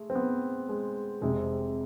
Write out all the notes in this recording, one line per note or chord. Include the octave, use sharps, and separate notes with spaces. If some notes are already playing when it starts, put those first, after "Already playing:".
Already playing: G#3 A3
C4
B3
G#3
F1 F2 C3 G#3